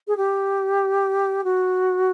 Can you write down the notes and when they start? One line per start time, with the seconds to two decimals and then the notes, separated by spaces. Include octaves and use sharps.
0.07 G#4
0.17 G4
1.44 F#4